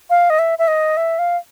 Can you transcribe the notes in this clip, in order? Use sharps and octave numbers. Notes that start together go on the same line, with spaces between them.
F5
D#5
E5
E5
D#5
E5
F5